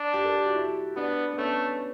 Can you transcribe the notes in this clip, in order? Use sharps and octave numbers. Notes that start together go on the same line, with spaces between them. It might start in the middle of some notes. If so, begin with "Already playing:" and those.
Already playing: D4
G4
A4
G4
F#4
E4
B3 D4
B3
A3 C#4